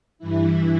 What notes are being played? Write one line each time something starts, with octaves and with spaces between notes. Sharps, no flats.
G2 E3 E4